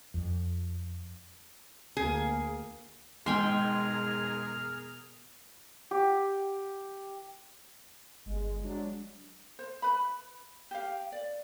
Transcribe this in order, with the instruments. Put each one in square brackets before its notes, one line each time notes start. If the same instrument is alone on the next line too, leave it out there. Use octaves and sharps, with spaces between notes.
[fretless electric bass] F2
[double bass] D2 A#3 [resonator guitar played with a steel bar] G#4
[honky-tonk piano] G#2 [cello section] B2 G#4 A#4 [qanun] G5 G#5 C6 [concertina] F6
[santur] G4
[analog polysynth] G1 G#3
F#3 G#3 D4
[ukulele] C5
B4 B5
G4 F5
D5